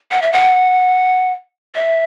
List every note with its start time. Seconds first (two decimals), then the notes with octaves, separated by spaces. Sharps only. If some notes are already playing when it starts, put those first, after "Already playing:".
0.11 F#5
0.22 E5
0.32 F#5
1.75 E5